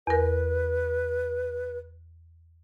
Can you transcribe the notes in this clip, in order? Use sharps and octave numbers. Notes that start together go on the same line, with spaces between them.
E2 A#4 B4